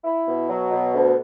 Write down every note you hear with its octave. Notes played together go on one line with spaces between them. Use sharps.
E4
B2
F#3
B2
D2